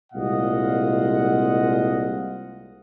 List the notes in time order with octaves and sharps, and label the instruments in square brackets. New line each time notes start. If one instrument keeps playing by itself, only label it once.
[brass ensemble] C2 A#2 G#3 D#5 F5 F#5